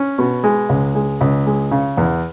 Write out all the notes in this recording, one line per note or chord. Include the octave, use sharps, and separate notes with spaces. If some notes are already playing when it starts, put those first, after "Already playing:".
Already playing: C#4
B2
G#3
C#2
G#3
C#2
G#3
C#3
E2